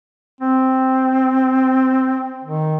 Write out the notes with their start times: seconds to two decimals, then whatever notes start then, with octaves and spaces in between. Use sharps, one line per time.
0.41 C4
2.44 D#3